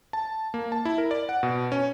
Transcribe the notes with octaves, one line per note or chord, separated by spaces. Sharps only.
A5
A#3
A5
E4
A#4
D5
F#5
B2
C#4